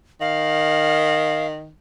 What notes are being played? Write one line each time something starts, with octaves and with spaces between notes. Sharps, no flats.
D#3 F5